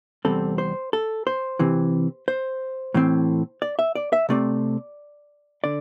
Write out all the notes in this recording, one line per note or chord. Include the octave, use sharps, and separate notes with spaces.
E2 C3 G3 C4 A4
C5
A4
C5
C3 E3 C4
C5
A2 E3 C4
D5
E5
D5
E5
C3 A3 C4 D5
D3 D5